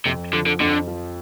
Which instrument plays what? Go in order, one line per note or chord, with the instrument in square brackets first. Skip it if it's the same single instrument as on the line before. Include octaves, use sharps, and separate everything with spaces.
[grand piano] F2 [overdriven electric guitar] C3
[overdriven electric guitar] D3 [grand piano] F3
[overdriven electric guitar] D3
[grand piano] F2 [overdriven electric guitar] D3
[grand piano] F3